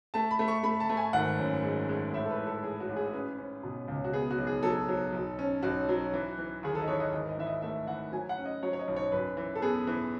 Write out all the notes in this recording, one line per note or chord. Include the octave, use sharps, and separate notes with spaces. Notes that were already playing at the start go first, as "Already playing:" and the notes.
A3 A5
B5
A3
C#6
A3 B5
A5
A3
G#5
G#1 F#5
F#2
G#3
G#3
A2 E5
A4
B4
E3
A4
E3 G#4
F#4
A1
G#4
C#4 B4
C#4
B2
C#2
F#4
B3 G#4
F#4
B1
G#4
F#3 A4
F#3
B1
C#4
B1 F#4
F#3
E3
E3
D#2 G#4
A4
D#5
E3 C#5
D#5
G#1 D#5
D#5
E3 E5
D#5
A3 E5
E3 F#5
F#3 G#5
F#5
C#4
D#5
F#3 C#5
C#5
D#5
B1
C#5
F#2 B4
E3
A4
B3 G#4
E3